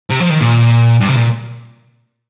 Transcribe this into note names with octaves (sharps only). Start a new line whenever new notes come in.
C3
F3
D#3
A#2
G2
C3
A#2